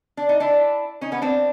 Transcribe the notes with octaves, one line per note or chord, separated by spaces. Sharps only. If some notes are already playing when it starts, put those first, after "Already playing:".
D4
D#4
D4 E4
C#4 D#4
B3 C#4
C4 D4